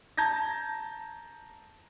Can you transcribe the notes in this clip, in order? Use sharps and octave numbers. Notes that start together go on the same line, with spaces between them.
A5 A#5 G6 G#6 A#6